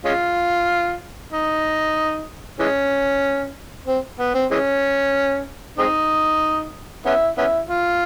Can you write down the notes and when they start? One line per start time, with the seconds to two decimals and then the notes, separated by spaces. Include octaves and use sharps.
0.05 G#3 C#4 F4
1.33 D#4
2.59 E3 G#3 C#4
3.87 C4
4.19 B3
4.35 C4
4.51 E3 G#3 C#4
5.79 G#3 C4 D#4
7.06 B3 C#4 E4
7.38 B3 C#4 E4
7.69 F4